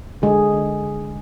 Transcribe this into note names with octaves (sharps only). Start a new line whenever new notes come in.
D3 G#3 G#4
D3
D3